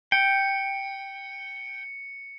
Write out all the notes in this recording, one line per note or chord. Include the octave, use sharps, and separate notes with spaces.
G5 C#7